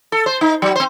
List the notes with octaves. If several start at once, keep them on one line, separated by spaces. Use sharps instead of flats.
A4
C5
D#4
F#3
C4 C5